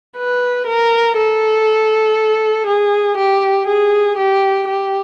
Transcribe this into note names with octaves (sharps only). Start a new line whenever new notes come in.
B4
A#4
A4
G#4
G4
G#4
G4
G4